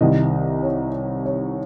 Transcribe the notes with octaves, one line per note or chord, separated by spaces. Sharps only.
C2 C3 D#3 D#5
C#5
C#5